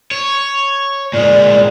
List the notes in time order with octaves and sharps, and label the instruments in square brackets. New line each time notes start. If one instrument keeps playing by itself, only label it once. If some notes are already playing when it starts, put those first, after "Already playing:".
[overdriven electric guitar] C#5
[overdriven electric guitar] A#2 G#3 [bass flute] D5